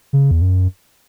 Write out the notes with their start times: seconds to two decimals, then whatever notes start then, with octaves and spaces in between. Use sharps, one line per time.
0.13 C#3
0.31 E2
0.42 F#2